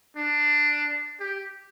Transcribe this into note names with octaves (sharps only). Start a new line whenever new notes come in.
D4
G4